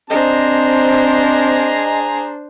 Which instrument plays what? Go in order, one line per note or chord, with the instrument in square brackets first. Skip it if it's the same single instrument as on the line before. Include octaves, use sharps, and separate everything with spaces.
[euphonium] C4 [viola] D4 C5 [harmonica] G#4 A#5 [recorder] D#5